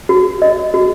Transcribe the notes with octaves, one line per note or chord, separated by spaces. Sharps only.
F#4
D#5
F#4